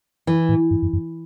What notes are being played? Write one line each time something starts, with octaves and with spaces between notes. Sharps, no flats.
E3
A2
G2
F#2
F#2